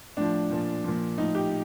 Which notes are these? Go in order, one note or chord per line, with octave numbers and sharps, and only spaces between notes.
A2 F3 D4
A#2 F3
A#2 F3
A2 F3 D#4
G4